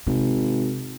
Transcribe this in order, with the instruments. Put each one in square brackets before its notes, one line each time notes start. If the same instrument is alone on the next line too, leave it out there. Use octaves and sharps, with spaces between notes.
[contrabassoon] G#1 [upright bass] C3